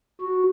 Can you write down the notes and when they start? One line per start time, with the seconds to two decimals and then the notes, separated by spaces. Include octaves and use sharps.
0.21 F#4